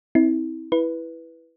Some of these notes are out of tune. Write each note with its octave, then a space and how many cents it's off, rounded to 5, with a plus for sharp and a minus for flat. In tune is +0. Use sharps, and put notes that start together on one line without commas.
C4 +0 E4 -35
E4 +0 B4 -5